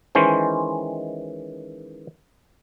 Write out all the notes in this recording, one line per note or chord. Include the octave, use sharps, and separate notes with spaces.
D#3 E3 G#3 C#4 C5